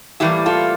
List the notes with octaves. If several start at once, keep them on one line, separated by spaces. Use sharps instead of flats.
A2 E3 G3 A#3 E4 G4
F4 A4